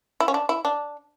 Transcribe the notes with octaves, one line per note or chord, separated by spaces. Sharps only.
E4
C#4
D4
E4
D4